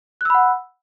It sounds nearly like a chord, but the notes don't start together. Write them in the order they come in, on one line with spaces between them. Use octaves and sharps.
F#6 E6 B5 F#5